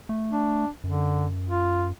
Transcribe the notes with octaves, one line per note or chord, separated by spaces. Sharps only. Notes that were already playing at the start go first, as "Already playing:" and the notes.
A3
D4
F#2 D3
F4